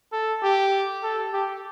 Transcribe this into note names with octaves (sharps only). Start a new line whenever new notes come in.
A4
G4
A4
G4